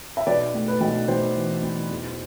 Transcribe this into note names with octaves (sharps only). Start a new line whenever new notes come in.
E5
B1 B4 D5
A2
B4
B1
B1 C5
E3
B1
E2